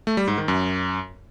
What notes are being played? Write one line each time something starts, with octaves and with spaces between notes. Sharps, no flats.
A3
G3
G#2
D#3
F#2